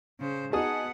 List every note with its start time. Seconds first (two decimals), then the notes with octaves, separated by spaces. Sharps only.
0.20 C#3 C5
0.53 B3 D#4 F#4 G#4 F#5 A5 D#6